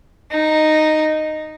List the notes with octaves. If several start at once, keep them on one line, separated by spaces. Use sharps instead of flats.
D#4